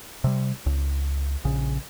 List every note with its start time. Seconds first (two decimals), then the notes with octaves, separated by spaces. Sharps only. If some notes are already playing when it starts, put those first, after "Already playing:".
0.24 C3 G3
0.66 C#2
1.44 A#1 C#3